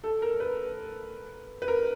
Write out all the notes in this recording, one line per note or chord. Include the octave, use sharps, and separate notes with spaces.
A4
A#4
B4
B4
A#4